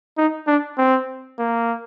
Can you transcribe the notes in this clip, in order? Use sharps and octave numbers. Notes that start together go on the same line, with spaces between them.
D#4
D4
C4
A#3